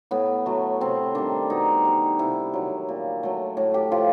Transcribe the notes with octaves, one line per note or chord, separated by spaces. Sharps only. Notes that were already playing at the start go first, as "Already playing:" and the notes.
A2 B3
F#3 A3
C3 C4
D#3 G3 D4
B2 D#4
G3
C3 E4
D#3 F#3
A#2
F#3 A3
A2
G4
F3 A3 F4